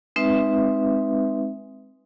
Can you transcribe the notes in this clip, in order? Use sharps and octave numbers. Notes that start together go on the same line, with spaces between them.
G#3 C4 D#4 B4 E5